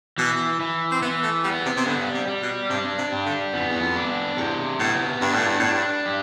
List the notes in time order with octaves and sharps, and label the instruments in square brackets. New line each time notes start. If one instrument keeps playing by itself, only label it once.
[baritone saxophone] B2 [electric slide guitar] E3
[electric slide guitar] E3
[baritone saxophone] C4
[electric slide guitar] E3 [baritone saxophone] B3
[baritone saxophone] A3
[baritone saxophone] G3 [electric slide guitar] B3
[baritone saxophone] C3
C3
[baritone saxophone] D3 [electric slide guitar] G3
[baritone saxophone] C3
[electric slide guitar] G3
[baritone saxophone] B2
[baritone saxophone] C3 [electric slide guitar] D4
[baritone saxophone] C3
[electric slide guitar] G3
[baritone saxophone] D3
[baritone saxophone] F2 [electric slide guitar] B3
[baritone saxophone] E2
F2
[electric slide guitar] D4
[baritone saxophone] E2 [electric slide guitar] C3
[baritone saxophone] A2 [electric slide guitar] B3
[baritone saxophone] G2 [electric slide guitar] D4
[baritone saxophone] A2
G2
[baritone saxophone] A2 [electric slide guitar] D4
[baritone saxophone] G2
[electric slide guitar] G4